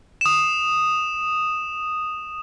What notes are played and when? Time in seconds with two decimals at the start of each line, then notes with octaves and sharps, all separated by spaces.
0.21 D#6 E7